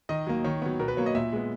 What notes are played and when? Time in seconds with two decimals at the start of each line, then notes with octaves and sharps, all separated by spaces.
0.09 D#3 D#5
0.27 F#3 A#3
0.44 D#3 C#5
0.62 F#3 B3
0.79 B2 A#4
0.88 B4
0.97 F#3 A#3 C#5
1.06 D#5
1.15 A#2 E5
1.32 G#3 B3